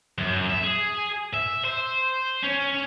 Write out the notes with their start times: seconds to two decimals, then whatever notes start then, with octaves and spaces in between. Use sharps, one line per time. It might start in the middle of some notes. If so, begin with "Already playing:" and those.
0.18 F#2
0.50 E5
0.63 G#4
1.34 E5
1.64 C5
2.43 C#4